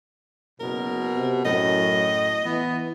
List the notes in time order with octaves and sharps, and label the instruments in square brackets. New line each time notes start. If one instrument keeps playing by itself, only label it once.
[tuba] F#1 [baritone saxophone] B2 [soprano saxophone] A#4
[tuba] C3
[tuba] F#2 [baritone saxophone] A2 [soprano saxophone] D#5
[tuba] E3 [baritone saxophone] B3